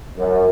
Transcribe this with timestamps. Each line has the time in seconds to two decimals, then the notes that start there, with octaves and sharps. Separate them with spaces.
0.18 F#2